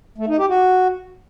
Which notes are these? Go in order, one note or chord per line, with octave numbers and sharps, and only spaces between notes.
A3
D#4
G4
F#4